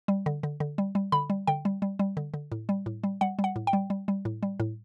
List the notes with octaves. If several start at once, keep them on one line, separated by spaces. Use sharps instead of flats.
G3
D3
D3
D3
G3
G3
D3 B5
G3
D3 G5
G3
G3
G3
D3
D3
A2
G3
A2
G3
G3 F#5
G3
F#5
A2
G5
G3
G3
G3
A2
G3
A2